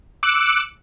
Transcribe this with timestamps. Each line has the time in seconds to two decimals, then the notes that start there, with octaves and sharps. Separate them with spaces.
0.23 D6 E6 F#6 C#7 D7